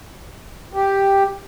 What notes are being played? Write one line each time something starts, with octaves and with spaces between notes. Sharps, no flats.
G4